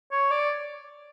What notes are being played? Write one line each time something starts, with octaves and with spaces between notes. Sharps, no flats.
C#5
D5